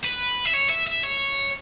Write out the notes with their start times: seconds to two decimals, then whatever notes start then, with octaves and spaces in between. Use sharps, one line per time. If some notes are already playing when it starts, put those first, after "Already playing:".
0.05 B4
0.46 E5
0.54 C#5
0.70 E5
0.87 E5
1.03 C#5